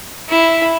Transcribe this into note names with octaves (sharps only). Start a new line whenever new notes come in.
E4